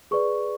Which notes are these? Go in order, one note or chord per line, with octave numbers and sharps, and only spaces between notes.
G#4 B4 D5 C#6